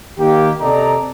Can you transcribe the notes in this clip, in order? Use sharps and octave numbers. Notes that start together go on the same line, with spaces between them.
D#3 A#3 G4
C3 A4 D5 D#5 A#5